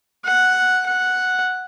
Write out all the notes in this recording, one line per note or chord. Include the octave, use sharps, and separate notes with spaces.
F#5
F#5